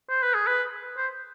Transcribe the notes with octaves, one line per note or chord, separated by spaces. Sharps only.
C5
B4
G#4
B4
C5